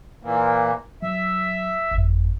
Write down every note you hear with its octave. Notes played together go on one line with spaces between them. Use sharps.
A#2 E3 A#3
F#3 E5
G1 F2